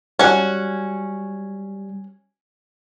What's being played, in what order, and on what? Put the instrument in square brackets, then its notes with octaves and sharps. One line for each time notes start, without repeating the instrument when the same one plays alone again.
[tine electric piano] G3 [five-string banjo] C#4 F#4